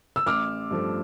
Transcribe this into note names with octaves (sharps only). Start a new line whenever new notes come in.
E6
A1 D6 F6
G2 F3 A3